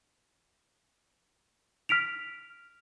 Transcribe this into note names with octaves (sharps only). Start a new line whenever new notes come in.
F6 B6 D7 F7